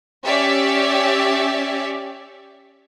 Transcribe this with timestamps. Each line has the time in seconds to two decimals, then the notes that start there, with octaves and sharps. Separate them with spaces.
0.25 C#4 G4 C#5 D5 E5